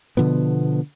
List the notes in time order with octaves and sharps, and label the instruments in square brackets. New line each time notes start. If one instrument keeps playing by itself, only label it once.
[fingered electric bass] B2 D3 F3 B3